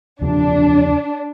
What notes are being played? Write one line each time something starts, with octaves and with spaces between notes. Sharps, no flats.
E2 C#3 F3 D4